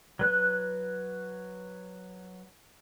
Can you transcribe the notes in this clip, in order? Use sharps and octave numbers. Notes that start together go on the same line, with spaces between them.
F#3 B4 F#6